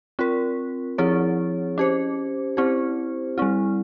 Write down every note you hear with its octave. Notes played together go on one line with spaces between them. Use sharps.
C4 F4 A#4
F3 C4 E4 G#4 C#5
C#4 G4 C5
C4 E4 G4 C5
G3 C4 E4